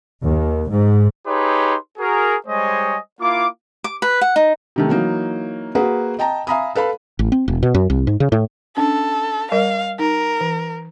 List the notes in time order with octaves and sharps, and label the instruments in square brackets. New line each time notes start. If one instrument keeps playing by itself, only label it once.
[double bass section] D#2
G#2
[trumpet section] D#4 G4 G#4 B4 C#5 C6
F#4 G#4 A#4
G3 G#3 C5 C#5 D#5 G#5
A#3 E4 F4 F5 D6
[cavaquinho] D6
B4
F#5
D#4
[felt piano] C3 D#3 A3
E3 F#3 A#3 D#4
A#3 F#4 G#4 B4
D#5 G5 A5 A#5
E5 F5 G#5 A#5 B5 D#6
A4 B4 F5 B5
[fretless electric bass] A1
C4
E1
B2
F#2
C2
G#2
C#3
A2
[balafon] C#4 D4 [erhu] A4
[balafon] G3 A#4 D#5 [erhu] F5
[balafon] D#4 [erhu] A#4
[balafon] E3